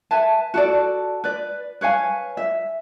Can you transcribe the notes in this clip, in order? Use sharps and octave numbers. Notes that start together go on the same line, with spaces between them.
B4 E5 G#5 A5
F#4 A4 D5
B4 D5
B4 C#5 F5 G#5
E5